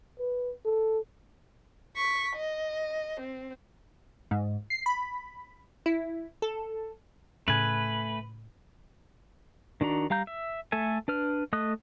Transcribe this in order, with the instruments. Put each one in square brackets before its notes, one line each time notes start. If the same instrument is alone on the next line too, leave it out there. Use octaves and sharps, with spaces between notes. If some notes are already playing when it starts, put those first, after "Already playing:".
[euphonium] B4
A4
[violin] C#6 B6
D#5
C4
[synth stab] G#2
C7
B5
E4
A4
[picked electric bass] A2 C#3 [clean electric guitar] A3 G#5 [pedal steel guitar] B4
[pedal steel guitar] D#3 D4 F#4 A#5
G3 F5 A#5 G6
E5
A3 A4 E5 G#5
D4 B4 F6
A3 D#5 D#6 F#6